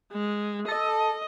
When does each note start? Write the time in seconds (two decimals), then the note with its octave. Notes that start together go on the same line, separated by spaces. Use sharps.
0.12 G#3
0.68 A4 D#5